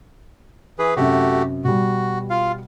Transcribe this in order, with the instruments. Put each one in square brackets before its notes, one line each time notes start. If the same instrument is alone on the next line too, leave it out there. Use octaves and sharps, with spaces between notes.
[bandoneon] E3 G#4 B4
[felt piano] F#2 C3 [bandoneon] A3 F#4 G4
[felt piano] B2 G3 [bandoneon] F#4
[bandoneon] F4 F5